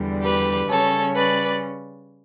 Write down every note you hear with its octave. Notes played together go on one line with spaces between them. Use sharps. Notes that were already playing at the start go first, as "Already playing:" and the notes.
Already playing: E2 D3 G3
G4 B4
C#3 G3 C#4 A4 C#5
B4 D5